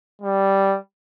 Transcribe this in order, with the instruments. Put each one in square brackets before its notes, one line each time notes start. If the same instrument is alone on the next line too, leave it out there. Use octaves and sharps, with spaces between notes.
[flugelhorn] G3